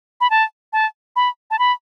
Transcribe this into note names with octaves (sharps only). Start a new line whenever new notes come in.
B5
A5
A5
B5
A5
B5